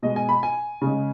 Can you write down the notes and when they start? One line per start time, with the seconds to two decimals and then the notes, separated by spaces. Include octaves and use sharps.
0.03 B2 G#3 D#5
0.16 G#5
0.29 B5
0.43 G#5
0.81 C#3 G#3